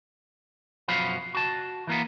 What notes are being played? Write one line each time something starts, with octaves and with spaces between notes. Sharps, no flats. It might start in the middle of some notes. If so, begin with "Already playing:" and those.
F#2 B2 F3 F#4 F5 B5
F#4 A5
E3 A#3 B3